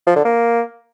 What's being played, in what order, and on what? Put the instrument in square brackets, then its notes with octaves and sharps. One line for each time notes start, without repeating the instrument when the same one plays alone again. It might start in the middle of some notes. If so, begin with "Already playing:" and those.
[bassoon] F3
D3
A#3